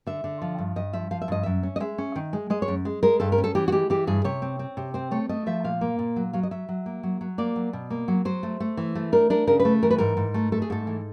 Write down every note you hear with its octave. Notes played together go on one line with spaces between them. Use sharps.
D3 E5
D3
F3
G2
G2 D#5
F3 E5
F3 F5
E5
G2 D#5
F#2 E5
C#4
D#5
G#3 E5
C#4
D#3
G#3
G#3 D#5
C#5
F#2
G#3
G#3 A#4
G2 A4
A#4
C#4
A4
E3 G4
F#4
G#3 G4
E3 G4
G2 G#4
C3 C#5
C4
C4
C3
C4 C5
A3 C#5
A3 D#5
F3 E5
A#2 F5
A#3
A#2
F#3
F#3 F5
D#5
F#3 E5
F#3
A#3
F#3
F#3
A#3 D5
F#3
B2
A#3
F#3
F#3 C5
A3
A3
E3
A3
D4 A#4
D4 A#4
C#3 A#4
B4
A3
E3 A#4
B4
G#2 A#4
G#2
A3
A3 A4
G#4
G#2 A4
E3